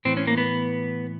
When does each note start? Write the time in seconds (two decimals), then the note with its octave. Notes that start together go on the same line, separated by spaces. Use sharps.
0.05 A2 E3 C4
0.17 C#4
0.27 A#3
0.38 B3